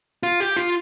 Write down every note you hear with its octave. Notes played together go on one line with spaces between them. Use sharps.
F4
G4
F4